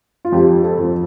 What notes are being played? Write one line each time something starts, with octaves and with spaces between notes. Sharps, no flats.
F4
F2 G4
A4
F2